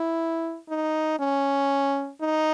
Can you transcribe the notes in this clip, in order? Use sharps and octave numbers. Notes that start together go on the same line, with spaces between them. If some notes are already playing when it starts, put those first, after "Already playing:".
Already playing: E4
D#4
C#4
D#4